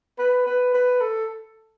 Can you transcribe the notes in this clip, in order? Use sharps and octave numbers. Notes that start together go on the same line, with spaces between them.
B4
B4
B4
A4